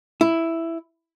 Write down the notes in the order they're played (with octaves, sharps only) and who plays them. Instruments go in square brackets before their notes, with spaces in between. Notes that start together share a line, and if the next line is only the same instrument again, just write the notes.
[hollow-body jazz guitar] E4